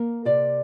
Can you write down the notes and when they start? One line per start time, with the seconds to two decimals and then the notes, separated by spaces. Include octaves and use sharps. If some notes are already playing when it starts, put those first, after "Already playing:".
Already playing: A#3 A#4
0.25 C3 D5